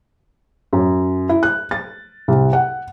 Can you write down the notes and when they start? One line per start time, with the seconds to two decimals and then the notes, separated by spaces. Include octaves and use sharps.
0.73 F#2
1.29 E4
1.43 F#6
1.71 A6
2.28 C2
2.53 F#5